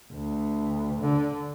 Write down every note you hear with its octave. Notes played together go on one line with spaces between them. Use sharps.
D2
D3